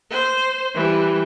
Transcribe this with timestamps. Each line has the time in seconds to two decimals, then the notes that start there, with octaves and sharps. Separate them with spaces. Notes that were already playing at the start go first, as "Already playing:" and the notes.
0.10 C5
0.75 E3 G3